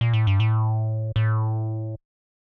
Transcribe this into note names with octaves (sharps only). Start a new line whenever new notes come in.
A#2
A2
G2
A2
A2